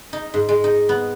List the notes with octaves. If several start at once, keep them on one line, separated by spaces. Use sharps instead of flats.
D#4
G#2
G#3
D#4
B3